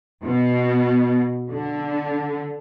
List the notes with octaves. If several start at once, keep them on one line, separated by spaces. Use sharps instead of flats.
B2
D3